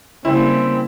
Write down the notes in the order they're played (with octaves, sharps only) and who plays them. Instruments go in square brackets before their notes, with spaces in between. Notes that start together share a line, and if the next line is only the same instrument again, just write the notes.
[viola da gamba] C#3 G3 A#3 [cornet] C4 [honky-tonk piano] E4